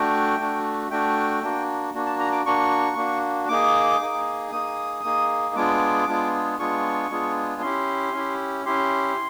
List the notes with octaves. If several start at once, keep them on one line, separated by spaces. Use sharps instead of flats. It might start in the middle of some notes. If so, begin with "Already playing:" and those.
Already playing: A3 D4 F#4 G5
A3 D4 F#4
A3 D4 F#4 G5
A#3 D4 F#4
A#3 D4 F#4
A5
A#5
D6
A#3 D4 F#4 C#6
A#3 D4 F#4
A#3 D#4 G#4 D6
A#3 D#4 G#4
A#3 D#4 G#4 D#6
A#3 D#4 G#4
G#3 B3 D4 F4 G#4 D6
G#3 B3 D4 F4 G#4
G#3 B3 D4 F4 G#4 C#6
G#3 B3 D4 F4 G#4
C#4 E4 G4 C6
C#4 E4 G4
C#4 E4 G4 C6